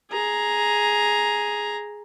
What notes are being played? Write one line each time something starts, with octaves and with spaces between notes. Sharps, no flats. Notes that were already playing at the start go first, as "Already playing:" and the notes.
G#4 A#5